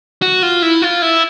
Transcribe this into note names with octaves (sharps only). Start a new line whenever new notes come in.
F#4
F4
E4
F4
E4